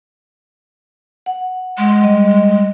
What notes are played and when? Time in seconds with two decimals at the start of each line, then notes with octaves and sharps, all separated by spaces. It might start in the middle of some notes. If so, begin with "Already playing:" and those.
1.26 F#5
1.78 G#3 C6
2.02 G3 D#5